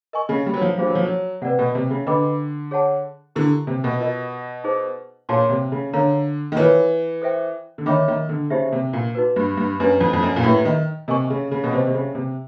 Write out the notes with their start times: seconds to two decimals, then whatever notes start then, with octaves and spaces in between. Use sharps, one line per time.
0.13 A#4 D#5 G#5 C#6
0.29 C#3
0.46 G3
0.54 F#3
0.61 F3
0.78 G3 D4 F4 G#4 C5 F5
0.87 F#3
0.95 F3
1.03 F#3
1.42 C3 B4 D5 F#5
1.59 B2
1.75 C3
1.90 C#3
2.06 D3 B4 D#5 G5 B5 D6
2.71 G#4 C#5 F#5 A5
3.36 D3 E4 G4 A#4
3.67 C3
3.84 B2
4.00 F4 A#4 D#5
4.64 D#4 G#4 C5
5.29 A#2 G#4 C#5 F5 A5 C6
5.50 C3
5.72 C#3
5.93 D3 A#4 C#5 F5 A#5
6.52 D#3
6.57 E3 F4 A#4 C#5
7.22 A4 C5 E5 G5
7.78 D3
7.86 D#3 C#5 E5 G5 B5 D6
8.08 D#3
8.29 D3
8.50 C#3 D#4 G4 C5 E5
8.72 C3
8.93 A#2
9.15 D#4 F#4 B4
9.36 G2
9.57 G2
9.80 F#2 D4 G4 B4
10.01 F2
10.13 F2
10.23 F#2
10.36 A#2
10.43 A2 E4 G4 B4 E5
10.65 D#3
11.08 C3 A#4 D#5 G#5 C#6
11.30 C#3
11.51 C#3
11.64 B2
11.72 C3 G4 C5 D#5
11.87 C3
11.94 C#3
12.15 C3